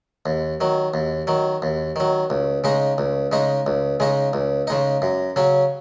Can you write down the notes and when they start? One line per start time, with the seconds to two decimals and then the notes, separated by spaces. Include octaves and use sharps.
0.26 D#2
0.61 D#3 F#3
0.94 D#2
1.27 D#3 F#3
1.62 D#2
1.96 D#3 F#3
2.30 C#2
2.64 C#3 G#3 D#4
2.98 C#2
3.32 C#3 G#3 D#4
3.67 C#2
4.00 C#3 G#3 D#4
4.33 C#2
4.67 C#3 G#3 D#4
5.02 F#2
5.36 C#3 F#3 C#4